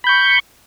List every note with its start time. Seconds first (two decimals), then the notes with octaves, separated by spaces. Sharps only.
0.04 B5
0.07 G6
0.09 C#6